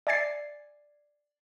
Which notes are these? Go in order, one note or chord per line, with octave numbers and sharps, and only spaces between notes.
D5 E5 G#5 G#6 A6 C7